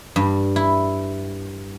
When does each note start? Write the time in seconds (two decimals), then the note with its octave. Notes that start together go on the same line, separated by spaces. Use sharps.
0.16 G2
0.56 E4